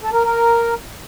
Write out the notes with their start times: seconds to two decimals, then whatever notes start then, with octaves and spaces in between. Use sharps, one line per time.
0.01 A4
0.13 A#4
0.24 A#4